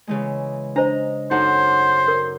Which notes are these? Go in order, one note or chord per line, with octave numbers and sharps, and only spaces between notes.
C#3 E3 G#3
D4 C5 D#5 A#5
F#2 D#4 A4 C5 F#5
A#4